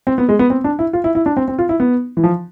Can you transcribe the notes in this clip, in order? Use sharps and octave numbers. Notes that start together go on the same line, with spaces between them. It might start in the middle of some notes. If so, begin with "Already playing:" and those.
C4
B3
G#3
B3
C4
D4
E4
F4
E4
E4
D4
C4
C4
F4
E4
B3
E3
F3